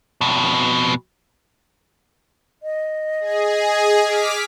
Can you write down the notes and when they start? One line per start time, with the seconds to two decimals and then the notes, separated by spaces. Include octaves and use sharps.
0.21 F2 B2
2.63 D#5
3.20 G#4
4.03 D6 F6 B6